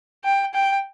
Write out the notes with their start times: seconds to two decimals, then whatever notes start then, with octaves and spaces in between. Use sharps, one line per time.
0.25 G5
0.54 G5